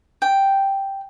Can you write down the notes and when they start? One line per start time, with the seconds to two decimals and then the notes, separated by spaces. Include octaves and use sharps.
0.22 G5